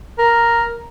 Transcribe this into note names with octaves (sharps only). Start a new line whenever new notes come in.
A#4